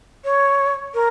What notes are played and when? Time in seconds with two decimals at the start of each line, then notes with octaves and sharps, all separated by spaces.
0.24 C#5
0.94 A#4